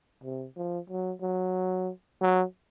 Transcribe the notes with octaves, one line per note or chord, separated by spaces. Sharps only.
C3
F3
F#3
F#3
F#3